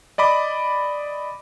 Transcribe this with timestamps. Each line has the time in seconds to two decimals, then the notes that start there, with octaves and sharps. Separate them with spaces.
0.18 D5 D#5 B5 D6